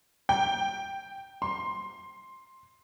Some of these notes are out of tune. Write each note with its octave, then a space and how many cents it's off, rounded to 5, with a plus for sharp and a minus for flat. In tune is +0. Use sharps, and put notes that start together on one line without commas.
G5 -5
C6 +10